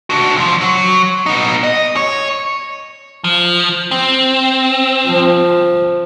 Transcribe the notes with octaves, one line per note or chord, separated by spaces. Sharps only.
D4 F#4
C#2 F3
F#3
B3 D#4
D#5
C#5
F3
C4
F3